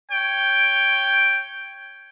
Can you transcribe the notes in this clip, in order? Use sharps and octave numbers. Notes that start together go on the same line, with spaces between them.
C#5 G5